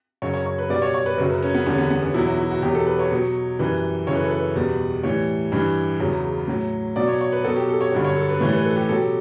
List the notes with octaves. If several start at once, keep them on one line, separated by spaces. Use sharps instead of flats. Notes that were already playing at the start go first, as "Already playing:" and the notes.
F#2 C#3 F#3 C#5
C#5
C#5
B4
B2 G3 D5
C#5
C#5
B4
F#2 C#3 F#3
B4
C#4
B3
E2 D3 G3 C#4
B3
B3
C#4
E2 B2 F#3 E4
F#4
E4
F#4
E2 B2 F#3 G4
A4
B4
C#5
B2 F#3
F#2 E3 G3 B4
F#2 C#3 E3 C#5
B4
A4
B4
E2 B2 G3
A2 E3 G3 C#5
G2 E3 G3
E2 C#3 F#3
A2 F#3
B2 F#3 D5
C#5
C#5
B4
B2 F#3 A4
G4
A4
C#5
G2 D3 F#3
C#5
A4
B4
A2 E3 G3 C#5
B4
A4
G4
B2 F#3 A4
G4